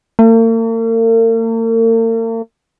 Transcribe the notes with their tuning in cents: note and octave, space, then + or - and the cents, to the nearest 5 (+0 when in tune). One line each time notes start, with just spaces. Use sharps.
A#3 -45